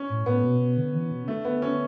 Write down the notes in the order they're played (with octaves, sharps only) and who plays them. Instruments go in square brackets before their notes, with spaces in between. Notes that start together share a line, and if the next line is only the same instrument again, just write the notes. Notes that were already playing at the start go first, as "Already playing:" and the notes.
Already playing: [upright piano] C#4
[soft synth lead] A2
[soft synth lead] A2 [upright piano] B3
[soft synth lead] B2
B2
D3
E3
B2
C#3
[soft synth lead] D3 [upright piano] A3
[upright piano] B3
C#4